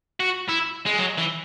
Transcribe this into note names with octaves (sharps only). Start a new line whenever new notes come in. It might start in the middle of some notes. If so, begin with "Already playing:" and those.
F#4
E4
G#3
F#3
E3